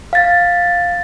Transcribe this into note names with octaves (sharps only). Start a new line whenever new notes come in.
F5 A6